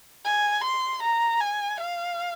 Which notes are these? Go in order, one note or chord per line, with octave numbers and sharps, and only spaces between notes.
G#5
C6
A#5
G#5
F5